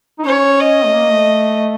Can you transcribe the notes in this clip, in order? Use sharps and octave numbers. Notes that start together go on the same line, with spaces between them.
D#4
C#4 C#5
D#5
A3
A#3
A3